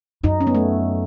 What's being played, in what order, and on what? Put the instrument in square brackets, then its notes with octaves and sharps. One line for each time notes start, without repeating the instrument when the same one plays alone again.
[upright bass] F#2 [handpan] D#4
[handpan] C#4
B3
A3